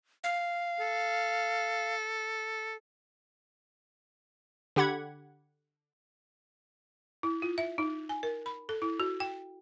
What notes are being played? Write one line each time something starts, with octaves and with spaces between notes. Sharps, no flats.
F5
A4
D3 G4 F#5 B5 G#6
E4
F4
E5
D#4
G#5
A#4
B5
A4
E4
F#4
G5